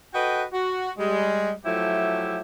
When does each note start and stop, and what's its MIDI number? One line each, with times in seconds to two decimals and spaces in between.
0.14 0.43 66
0.14 0.43 69
0.14 0.43 71
0.14 0.43 75
0.14 0.43 79
0.52 0.91 66
0.98 1.51 55
0.98 1.51 56
1.65 2.40 53
1.65 2.40 54
1.65 2.40 57
1.65 2.40 64
1.65 2.40 67